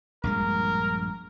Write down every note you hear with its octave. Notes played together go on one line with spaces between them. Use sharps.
A#1 G2 G#3 A#4